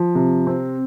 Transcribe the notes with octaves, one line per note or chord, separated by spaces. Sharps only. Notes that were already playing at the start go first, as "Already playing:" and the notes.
Already playing: F3
C3
C4